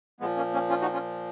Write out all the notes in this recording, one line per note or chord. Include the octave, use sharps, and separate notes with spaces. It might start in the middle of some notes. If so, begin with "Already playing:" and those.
A#2 F3 G#3 B3
A#3 C#4
A#3 C#4
C#4 F4
D#4 F#4
C#4 F4